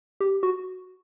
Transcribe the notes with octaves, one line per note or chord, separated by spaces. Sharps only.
G4
F#4